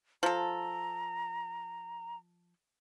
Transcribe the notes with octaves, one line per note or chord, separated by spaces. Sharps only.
F3 A4 A#5